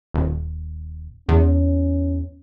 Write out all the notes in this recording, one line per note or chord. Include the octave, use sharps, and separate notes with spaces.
D#1
E2 C#4